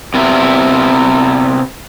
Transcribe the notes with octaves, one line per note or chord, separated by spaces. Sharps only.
C3 B3 E4